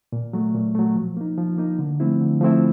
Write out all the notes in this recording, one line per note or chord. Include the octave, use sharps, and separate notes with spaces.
A#2
F#3 A3
A#2
F#3 A3
F3
A#3 D#4
F3
A#3 D#4
D3
F3 A3 C4 E4
D3
F3 A3 C4 E4